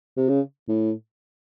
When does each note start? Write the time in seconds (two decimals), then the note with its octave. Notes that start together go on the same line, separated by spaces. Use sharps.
0.17 C3
0.29 C#3
0.68 A2